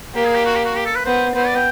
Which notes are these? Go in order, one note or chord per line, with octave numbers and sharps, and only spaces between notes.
A#3 G4
G#4
G4
F#4
G4
F#4
G4
A4
B4
B3 C5
B3 C5
D5
G5